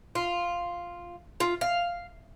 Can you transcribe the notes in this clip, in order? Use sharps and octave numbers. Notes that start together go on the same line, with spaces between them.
F4
F4
F5